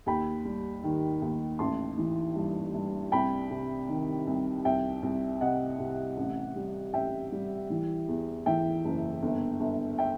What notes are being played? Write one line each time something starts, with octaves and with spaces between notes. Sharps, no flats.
D#2 G5 B5
G3
D#3
D#2
A1 A5 C6
E3
G2
G2
C2 G5 B5
C3
D#3
C2
C2 E5 G5
C2
C3 D#5 F#5
C3
A1
G3
A1 E5 G5
G3
E3
E2
E3 E5 G5
F#1
G1
G1
E5 G5